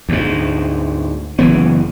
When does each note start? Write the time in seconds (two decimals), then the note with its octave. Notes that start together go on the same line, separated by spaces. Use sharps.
0.09 D2 G#2
1.39 F#1 E3 B3